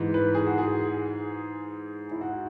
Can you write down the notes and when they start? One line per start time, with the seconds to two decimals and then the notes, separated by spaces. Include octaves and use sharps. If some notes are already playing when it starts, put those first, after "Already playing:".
Already playing: G#2 E3
0.14 B4
0.35 G#4
0.47 F#4
0.58 G#4
2.12 E4
2.21 F#4